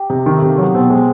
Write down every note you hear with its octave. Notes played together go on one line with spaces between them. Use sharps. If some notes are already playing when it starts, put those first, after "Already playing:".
Already playing: G4
C3 D#4
D#3
A3
C3
A#3
F#3 B3
B2 C4
G#3